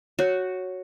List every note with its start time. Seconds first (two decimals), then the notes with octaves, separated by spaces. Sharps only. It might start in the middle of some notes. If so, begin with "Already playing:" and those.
0.19 F#4 C#5